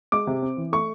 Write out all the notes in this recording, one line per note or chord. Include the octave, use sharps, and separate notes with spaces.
G#3 D6
C3
C4
E3
A3 C#6